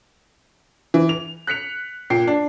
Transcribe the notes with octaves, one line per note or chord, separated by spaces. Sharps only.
E3
F7
F#6 B6 C#7 F7
A#2 G5 C7
D4